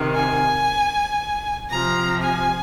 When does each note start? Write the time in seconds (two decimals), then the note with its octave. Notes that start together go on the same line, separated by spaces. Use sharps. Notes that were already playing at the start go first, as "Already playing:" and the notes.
Already playing: C3 D#3
0.14 G#5
1.70 C3 F3 A#5
2.22 G#5